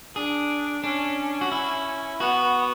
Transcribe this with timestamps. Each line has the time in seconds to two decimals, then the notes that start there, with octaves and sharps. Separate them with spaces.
0.16 D4 G#4
0.84 C#4 D4
1.41 F#4
1.52 E4
2.20 B3 F#4